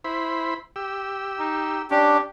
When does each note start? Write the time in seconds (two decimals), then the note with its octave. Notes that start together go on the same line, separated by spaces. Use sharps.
0.04 E4 C5 B5
0.76 G4 E6
1.39 D#4
1.91 C#4 D4 G4